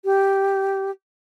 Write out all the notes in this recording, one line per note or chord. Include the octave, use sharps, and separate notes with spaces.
G4